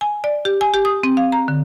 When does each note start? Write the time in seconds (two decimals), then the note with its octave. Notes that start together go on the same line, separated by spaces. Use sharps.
0.01 G#5
0.24 D5
0.45 G4
0.61 G#5
0.74 G4
0.85 D#6
1.03 C4
1.17 F5
1.32 A#5
1.48 D3